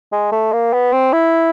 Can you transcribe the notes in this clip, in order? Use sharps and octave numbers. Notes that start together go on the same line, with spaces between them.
G#3
A3
A#3
B3
C4
E4